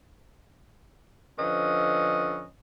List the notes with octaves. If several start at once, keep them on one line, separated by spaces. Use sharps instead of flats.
D3 F3 C#4 B4 D#5